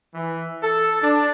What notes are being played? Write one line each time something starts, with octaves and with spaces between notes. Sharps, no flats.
E3
A4
D4